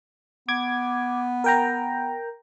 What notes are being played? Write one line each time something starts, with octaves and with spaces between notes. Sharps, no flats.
B3 D6 G#6
A#4 G5 A#5